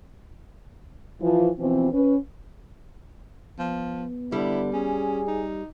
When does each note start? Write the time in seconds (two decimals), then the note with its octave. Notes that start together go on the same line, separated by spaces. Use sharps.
1.22 E3 F3
1.59 B2 E3 F3 C4
1.93 C#4 B4
3.59 F3 B3
4.32 D3 G3 E4
4.73 C#4 G#4
5.28 D#4